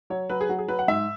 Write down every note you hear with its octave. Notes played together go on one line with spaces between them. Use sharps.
F#3 C#5
F#3 B4
G#4
F#3 F#4
G#4
F#3 B4
F#5
G#2 E5